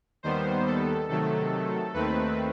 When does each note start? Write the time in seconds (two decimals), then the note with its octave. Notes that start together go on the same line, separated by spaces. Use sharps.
0.23 D#2 D#3 G3 B3 C5
0.66 A4
1.09 C3 D#3 F#3 A3 A4
1.94 D#2 D#3 A3 C4 B4